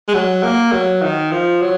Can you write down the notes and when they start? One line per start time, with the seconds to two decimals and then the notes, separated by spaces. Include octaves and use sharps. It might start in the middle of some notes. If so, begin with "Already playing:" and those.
0.09 G#3
0.14 F#3
0.43 A#3
0.73 F#3
1.03 D#3
1.32 F3
1.62 F#3